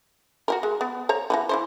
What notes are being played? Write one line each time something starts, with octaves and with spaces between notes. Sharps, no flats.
F#4 G4 A#4
G#3
B3
C5 C#5 A#5
E3 F#3 B3
E3 E4 C5